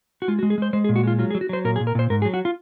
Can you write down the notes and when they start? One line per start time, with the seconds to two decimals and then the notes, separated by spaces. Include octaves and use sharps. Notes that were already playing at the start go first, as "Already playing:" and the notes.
0.22 F#4
0.28 G#3 F4
0.39 F#4
0.43 G#3
0.50 G#4
0.58 G#3 C5
0.73 G#3 C5
0.84 G#4
0.89 A#2
0.96 F#4
1.03 G#3 F4
1.19 F#3 F4
1.31 G#4
1.35 F#3
1.41 F#4
1.49 F#3 C5
1.65 A#2 A#4
1.76 G#4
1.80 A#2
1.87 A#4
1.95 A#2 C5
2.10 G#2 A#4
2.22 G#4
2.25 F#3
2.34 F#4
2.45 F4